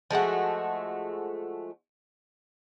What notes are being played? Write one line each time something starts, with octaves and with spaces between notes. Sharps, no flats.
F3 G#3 A3 F#4